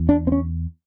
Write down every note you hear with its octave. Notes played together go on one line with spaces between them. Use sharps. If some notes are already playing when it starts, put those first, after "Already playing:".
Already playing: E2
D4
C4
C#4